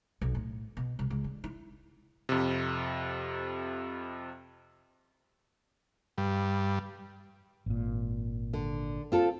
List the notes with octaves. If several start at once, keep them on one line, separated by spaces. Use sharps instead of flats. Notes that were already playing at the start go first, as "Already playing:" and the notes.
B1
A2
B2
C2
C#2
D3
E4
F2 C3
G2
G#1 A#2
D3
C4 F4 A4